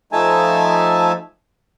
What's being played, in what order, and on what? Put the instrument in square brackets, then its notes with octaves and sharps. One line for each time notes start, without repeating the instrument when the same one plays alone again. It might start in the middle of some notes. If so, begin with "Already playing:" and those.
[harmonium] F3 A3 D#4 E5 G#5 A5